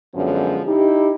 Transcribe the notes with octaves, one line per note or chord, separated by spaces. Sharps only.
F#2 D3 F3 G#3 B3
D#4 E4 G4